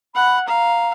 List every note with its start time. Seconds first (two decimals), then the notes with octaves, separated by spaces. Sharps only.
0.15 F#5 B5
0.48 F5 A#5